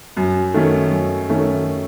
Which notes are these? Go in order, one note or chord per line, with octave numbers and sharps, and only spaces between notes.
F#2
D#3 A3 C#4
F#2
D#3 A3 C#4